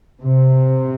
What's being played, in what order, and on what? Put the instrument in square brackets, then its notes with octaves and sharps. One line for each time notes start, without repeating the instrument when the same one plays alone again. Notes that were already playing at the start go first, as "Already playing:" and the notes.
[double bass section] C3